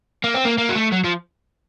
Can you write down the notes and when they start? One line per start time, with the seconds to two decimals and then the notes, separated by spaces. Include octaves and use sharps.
0.24 A#3
0.34 C4
0.45 A#3
0.58 A#3
0.69 F#3
0.76 A3
0.92 F#3
1.04 F3